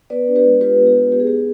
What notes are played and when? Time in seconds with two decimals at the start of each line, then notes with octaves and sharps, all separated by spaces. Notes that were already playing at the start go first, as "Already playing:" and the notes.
0.10 B3 B4 D5
0.27 D4
0.36 G4 B4
0.44 G#3
0.61 F4 G4 B4
0.78 B3
0.87 G4
0.95 B3
1.12 B3 G4
1.20 G#4
1.27 D#4 G4